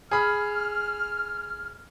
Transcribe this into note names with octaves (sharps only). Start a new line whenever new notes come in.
G#4 B5 F6